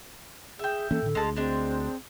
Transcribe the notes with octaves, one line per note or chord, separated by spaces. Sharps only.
G#4 E5 G5
E3 A#3 C#4 A4
A2 D3
D2 G#3 A5
G#3 C4 D4